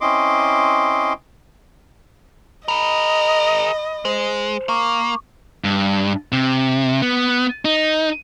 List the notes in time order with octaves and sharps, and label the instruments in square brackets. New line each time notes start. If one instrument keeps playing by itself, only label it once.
[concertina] C4 C#4 E4 D#5 C6 D6
[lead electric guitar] G#4 A#4 [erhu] D#5 [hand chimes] B5
[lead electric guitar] G#3 [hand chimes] C5
[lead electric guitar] A#3 [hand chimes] C#6 D6
[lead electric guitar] G2
C3
B3
D#4